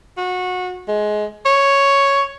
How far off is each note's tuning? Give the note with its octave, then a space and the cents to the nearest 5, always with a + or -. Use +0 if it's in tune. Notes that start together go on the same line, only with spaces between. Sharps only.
F#4 -25
G#3 +20
C#5 +0